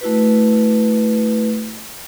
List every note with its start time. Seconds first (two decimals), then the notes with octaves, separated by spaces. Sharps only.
0.01 A3 E4 F#4 B4